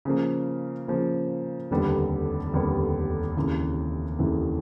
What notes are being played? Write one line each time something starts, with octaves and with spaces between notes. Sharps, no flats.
C#3 F3 A#3
C#3 F3 A#3
F1 D#2 D3 G3 B3
F1 D#2 D3 G3 B3
F1 D#2 C#3 E3
F1 D#2 C#3 E3